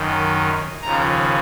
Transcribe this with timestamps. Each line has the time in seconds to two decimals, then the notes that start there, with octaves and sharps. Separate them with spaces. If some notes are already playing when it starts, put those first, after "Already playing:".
Already playing: F#2 D#3
0.82 D#2 C#3 F3 A#5